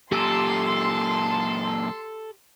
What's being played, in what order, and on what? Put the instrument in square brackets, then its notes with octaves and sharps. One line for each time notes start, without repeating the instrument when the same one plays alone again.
[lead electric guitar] F#2 A#2 [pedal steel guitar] G4 E6 [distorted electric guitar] A4 [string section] C6